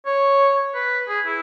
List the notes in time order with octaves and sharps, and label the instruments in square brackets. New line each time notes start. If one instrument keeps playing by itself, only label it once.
[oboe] C#5
B4
G#4
E4